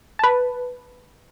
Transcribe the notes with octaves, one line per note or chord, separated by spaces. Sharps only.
B4 A5